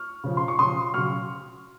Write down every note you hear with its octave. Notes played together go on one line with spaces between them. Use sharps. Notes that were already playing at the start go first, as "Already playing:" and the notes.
Already playing: C#6 F6
C#3 F3
C6
C#6
C#3 F3 C6 D#6
C#3 F#3 C#6 F6